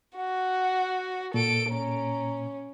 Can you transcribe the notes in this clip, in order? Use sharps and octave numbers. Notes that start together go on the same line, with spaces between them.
F#4 F#5
A#2 A4 D7
C#4 A#5